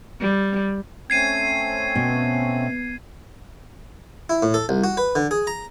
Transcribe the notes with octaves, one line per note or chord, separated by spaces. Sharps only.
G3
A3 C4 C#4 G#6 C7 D#7
B2
E4
A2
A4
C2
F#4
B4
D3
G#4
A#5